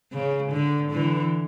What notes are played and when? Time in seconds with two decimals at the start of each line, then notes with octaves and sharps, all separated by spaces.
0.12 C#3
0.52 D3
0.92 D3 E3